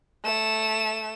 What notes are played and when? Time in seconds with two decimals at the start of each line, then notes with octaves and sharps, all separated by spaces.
0.24 A3 E7